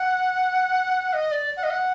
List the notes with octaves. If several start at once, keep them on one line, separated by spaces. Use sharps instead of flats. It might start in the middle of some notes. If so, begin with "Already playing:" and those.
Already playing: F#5
D#5
D5
F#5
D#5
F#5